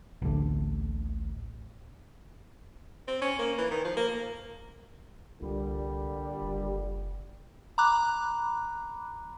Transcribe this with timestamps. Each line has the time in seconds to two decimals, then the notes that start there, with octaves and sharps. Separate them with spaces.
0.22 A1 D2 D3
3.08 C4
3.21 C#4
3.39 A#3
3.58 E3
3.71 D#3
3.85 F3
3.97 A#3
5.42 C2 A#2 D3 G3
6.41 F#1
7.78 A#5 B5 D6 F#6